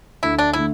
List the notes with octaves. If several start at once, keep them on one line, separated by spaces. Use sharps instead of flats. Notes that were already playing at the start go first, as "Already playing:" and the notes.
D2 D3 A3 E4
D4
D3 A3 E4